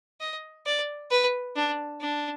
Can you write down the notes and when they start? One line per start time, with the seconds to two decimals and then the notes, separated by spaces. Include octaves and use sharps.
0.20 D#5
0.66 D5
1.11 B4
1.56 D4
2.01 D4